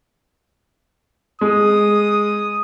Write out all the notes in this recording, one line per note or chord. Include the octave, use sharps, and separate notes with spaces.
G#3 D#6